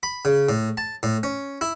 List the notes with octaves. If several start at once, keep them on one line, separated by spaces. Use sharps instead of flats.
B5
C#3
A2
A5
A2
C#4
E4